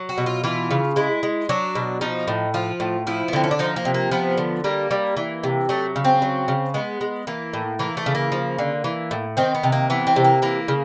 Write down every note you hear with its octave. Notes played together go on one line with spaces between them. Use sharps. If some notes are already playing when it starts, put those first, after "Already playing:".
Already playing: F#3
F#4
B2
F4
E3 F4
C#3
G#3 E4
G#3
F#3 D4
B2
F3 D#4
A2
F3 F4
A2
F3 E4
B3
D3 C4
C#4
D4
F3 D#4
A#3
C3
A#3
F3 B3
D3
G3 A#3
G3
E3
C3
F#3 A3
C#3
C4
F#3
C#3
G#3 B3
G#3
E3 A#3
A2
E3 A#3
A3
C#3
A#3
F3
D3
E3
A2
D#3 C4
B3
C3
A#3
E3 B3
C4
C3
A#3
E3 A#3
C#3